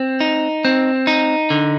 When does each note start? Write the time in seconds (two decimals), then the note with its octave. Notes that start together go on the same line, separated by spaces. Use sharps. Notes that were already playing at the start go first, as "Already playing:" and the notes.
Already playing: C4
0.20 D#4
0.65 C4
1.07 D#4
1.50 D3